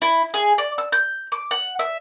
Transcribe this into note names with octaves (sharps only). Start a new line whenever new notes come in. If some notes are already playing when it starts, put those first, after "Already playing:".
E4
G#4
D5
E6
G6
D6
F#5
E5